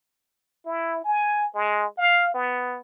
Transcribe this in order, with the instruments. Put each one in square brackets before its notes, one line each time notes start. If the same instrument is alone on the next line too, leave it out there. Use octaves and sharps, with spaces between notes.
[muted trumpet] E4
G#5
G#3
F5
B3